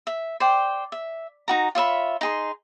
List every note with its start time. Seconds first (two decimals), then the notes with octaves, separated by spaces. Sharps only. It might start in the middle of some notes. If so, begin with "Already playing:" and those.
0.07 E5
0.40 C5 D5 G5
0.92 E5
1.48 D#4 F#4 A#5
1.75 F4 C#5 E5 B5
2.21 D#4 G#4 C6